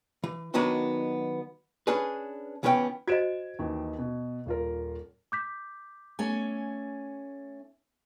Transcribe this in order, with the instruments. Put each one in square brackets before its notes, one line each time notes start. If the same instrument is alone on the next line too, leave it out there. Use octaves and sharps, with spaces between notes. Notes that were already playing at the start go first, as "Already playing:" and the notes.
[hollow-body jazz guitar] E3
D#3 F#3 B3 D4 F#4 D#5
C#4 D4 G#4 B4
C#2 E3 B3 C#4 D#5 G5
[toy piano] F#4 C5 D#5 [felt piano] G#6 D7 E7
[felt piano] D#2 D#3 E3
B2
D#1 F4 A#4
[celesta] D6 G6 B6
[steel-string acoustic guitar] A3 C#4 G#5